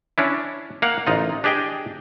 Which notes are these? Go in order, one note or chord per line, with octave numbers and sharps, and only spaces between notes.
C#4 D4 E4
A#3 F5 F#5
A1 D#4 F4
D4 G4 G#4 D#5 G5